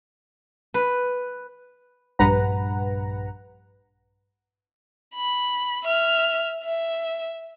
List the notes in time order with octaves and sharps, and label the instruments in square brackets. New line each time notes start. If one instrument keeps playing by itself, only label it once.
[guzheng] B4
[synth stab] A#1 G2 B4 F#5 A#5
[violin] B5
E5 F6
E5